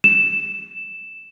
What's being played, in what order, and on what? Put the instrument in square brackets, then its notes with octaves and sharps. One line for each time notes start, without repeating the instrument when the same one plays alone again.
[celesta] E7